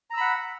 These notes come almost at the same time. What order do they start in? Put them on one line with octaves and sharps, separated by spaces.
A#5 E6 B5 F#5